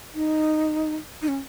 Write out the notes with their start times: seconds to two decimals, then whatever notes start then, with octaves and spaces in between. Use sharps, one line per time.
0.15 D#4
1.22 D#4
1.28 C#4